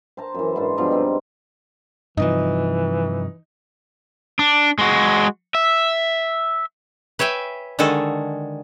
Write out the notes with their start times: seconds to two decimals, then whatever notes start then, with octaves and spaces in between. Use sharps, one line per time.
0.17 C5 A5 A#5
0.34 F#2 E3
0.56 G#2 D4 C5
0.78 G2 B2 F3 D4
0.91 C4 D#4
2.17 G2 C3 E3 F3 D#4
4.39 D4
4.78 G#3 F#4
5.55 E5
7.19 B4 C#5 E5 G5 G#5
7.79 D3 D#3 G#3 F#4 A4